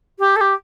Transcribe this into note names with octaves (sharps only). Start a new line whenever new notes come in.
G4
A4
G4